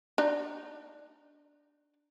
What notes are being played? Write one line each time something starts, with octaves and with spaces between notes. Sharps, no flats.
D4 D#4